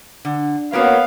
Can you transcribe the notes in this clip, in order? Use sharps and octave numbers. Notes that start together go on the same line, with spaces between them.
D3
A#3 B3 C#4 F#4 A#4 C#5 F5